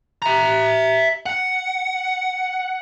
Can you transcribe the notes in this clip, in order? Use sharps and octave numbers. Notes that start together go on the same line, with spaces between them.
E5 A#5
F#5